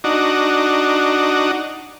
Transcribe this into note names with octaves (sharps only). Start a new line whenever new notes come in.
D4 D#4 F#4